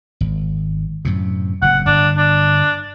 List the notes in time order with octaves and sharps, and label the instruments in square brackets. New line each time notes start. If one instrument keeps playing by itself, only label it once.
[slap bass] G#1
F#2 A2 C3
[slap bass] F#1 A2 C3 [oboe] F#5
[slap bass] G1 [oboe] D4
[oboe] D4